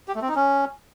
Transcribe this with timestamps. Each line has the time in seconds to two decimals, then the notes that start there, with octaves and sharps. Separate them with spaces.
0.08 G4
0.15 A3
0.22 C4
0.29 D#4
0.35 C#4